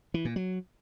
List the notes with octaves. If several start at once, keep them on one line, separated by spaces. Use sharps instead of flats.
E3
A#2
F#3